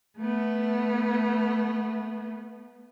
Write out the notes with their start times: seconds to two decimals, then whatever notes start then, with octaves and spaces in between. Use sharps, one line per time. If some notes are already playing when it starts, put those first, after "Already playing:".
0.18 A3 B3